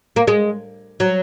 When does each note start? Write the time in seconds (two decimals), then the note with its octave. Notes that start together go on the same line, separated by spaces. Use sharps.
0.16 A#3
0.27 G#3
1.00 F#3